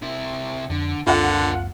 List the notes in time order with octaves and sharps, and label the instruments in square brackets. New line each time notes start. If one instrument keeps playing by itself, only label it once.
[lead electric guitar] C3 E4
[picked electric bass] F2 [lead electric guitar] D3
[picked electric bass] C#2 F#2 C4 [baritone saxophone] D3 [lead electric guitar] A#3 A4 [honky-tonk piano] F4 F#5